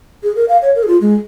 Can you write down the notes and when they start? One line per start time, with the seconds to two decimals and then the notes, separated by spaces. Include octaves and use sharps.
0.23 G#4
0.36 A#4
0.48 F5
0.62 C#5
0.75 A#4
0.83 G#4
0.88 F4
1.01 G#3